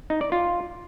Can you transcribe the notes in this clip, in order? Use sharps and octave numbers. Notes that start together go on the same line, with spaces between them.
D#4
D5
F4